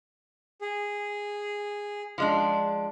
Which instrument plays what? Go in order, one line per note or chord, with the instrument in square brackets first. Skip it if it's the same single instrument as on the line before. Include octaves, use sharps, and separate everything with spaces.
[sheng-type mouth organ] G#4
[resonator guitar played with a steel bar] F3 G#3 D4